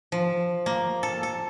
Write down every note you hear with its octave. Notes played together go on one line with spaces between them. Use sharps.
F3
A#3
A4
A4